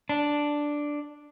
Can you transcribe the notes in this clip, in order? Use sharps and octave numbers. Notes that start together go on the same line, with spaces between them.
D4